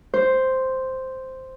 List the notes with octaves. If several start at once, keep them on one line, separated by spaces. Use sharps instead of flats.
C5